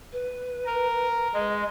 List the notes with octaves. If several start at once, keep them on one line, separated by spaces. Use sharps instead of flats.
B4
A#4
G#3 D#5